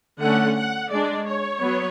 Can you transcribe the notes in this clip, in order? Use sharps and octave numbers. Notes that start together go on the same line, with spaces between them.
D3 A3 C#4 F#5
F#5
G#3 D4 D5
C#5
F#3 B3